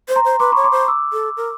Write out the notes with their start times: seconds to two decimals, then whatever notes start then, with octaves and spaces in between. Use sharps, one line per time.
0.09 C5
0.16 A#5 C6
0.25 C5
0.40 B4 C6 D6
0.52 B5 C#6
0.56 C#5
0.64 C6 D6
0.72 C5
0.88 D6 E6
1.13 A4
1.37 A#4